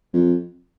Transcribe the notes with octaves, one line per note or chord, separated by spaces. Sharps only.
F2